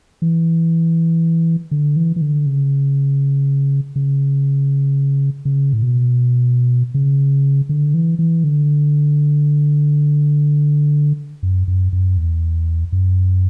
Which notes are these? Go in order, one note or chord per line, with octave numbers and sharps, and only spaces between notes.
E3
D3
E3
E3
D3
C#3
C#3
C#3
A2
B2
C#3
D3
E3
E3
D3
F#2
F#2
F#2
E2
F#2